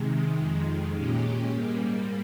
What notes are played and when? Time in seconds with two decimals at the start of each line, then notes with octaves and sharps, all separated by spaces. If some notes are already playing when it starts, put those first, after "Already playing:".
Already playing: C3 D#3 G#3
0.36 F2 D#3 G#3
0.94 A#2 G#3 C#4 G4
1.51 G#2 G3 A#3